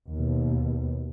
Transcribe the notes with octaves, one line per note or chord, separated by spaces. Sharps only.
D#2 B2